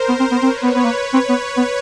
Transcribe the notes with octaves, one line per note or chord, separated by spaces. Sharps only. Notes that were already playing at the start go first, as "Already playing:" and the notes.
Already playing: A#4 C5
B3
C4
B3
C4 B4 C#5
B3
B3
A#3
C4
B3
B3